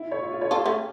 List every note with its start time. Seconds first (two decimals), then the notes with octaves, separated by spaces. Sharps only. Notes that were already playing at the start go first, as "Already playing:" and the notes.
Already playing: E4
0.11 C#5
0.21 F4
0.32 F4
0.41 C#5
0.51 F4 G4 A4
0.66 A3 C#4